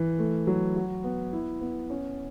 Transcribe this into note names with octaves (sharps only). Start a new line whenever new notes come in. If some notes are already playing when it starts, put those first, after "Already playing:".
Already playing: E3
A3
F#3
F#4
B3
E4
B3
C#4